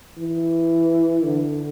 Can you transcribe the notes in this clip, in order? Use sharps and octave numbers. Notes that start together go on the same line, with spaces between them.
E3
D3